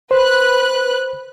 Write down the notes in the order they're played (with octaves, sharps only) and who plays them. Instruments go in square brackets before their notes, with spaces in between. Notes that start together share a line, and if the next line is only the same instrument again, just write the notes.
[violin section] B4 F#6 [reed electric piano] C5